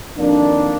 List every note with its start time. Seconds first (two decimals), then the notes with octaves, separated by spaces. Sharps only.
0.18 F2 D#3 A#3 D4